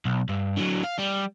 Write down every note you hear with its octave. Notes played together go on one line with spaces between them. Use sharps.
B1
G2
D3 F#3
F5
G3